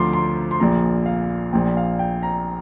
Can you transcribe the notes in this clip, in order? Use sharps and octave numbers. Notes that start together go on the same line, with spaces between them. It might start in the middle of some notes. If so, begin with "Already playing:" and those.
Already playing: D2 D3 F3 C6 D6
C6
C6
A#1 A#2 F3 A#5
F5
A#1 A#2 F3 G5
F5
G5
A#5